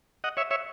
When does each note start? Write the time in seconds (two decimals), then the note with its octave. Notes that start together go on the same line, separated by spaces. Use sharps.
0.24 D#5 F#5
0.37 C#5 E5
0.51 C#5 E5